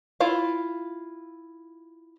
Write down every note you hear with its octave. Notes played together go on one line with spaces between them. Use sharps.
E4 F4 F5